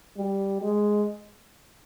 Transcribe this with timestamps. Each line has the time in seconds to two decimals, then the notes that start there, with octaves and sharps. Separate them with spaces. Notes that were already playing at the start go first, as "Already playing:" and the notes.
0.17 G3
0.62 G#3